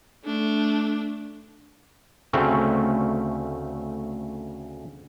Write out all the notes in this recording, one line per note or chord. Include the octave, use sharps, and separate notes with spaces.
A3 D4
D2 C#3 A3 C4 C#4